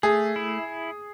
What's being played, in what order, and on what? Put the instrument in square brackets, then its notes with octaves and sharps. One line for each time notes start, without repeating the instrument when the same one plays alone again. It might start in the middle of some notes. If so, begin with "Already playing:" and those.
[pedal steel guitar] A3 [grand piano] G#4
[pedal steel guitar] E4